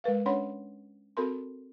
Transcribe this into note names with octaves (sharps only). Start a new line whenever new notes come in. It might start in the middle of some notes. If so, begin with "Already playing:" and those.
G#3 A#4 B4 F5
C#4 D4 C#5 F#5 B5 C6
C4 F#4 A4 A#4 B5 C6